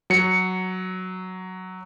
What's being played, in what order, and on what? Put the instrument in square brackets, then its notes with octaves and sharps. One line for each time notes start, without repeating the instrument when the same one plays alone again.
[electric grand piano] F#3 C#7